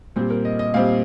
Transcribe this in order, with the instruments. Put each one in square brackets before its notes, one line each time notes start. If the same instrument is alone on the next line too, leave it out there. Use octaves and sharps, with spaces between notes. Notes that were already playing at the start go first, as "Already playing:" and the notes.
[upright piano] A#2 G3 C4 C5
A#4
D#5
D#5
A#2 G3 C4 F5